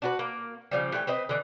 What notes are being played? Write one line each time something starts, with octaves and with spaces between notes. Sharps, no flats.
D4 F#4 B4
A#3
C#3 F3 G3
E3 A3 G4
C4 B4 D#5
D3 E3